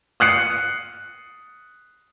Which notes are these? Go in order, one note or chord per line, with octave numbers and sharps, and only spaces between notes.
D#6 F#6 C7 C#7